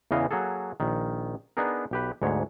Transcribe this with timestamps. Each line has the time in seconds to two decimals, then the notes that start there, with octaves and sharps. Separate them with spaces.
0.11 E2 C#3 E3 D#5 F5
0.31 F#3 A#3 F#4 G#4 A4
0.80 A#1 D#3
1.57 B3 D4 D#4 G#4 A#4
1.91 B1 G4 B4
2.22 D2 G#2 B3 C#5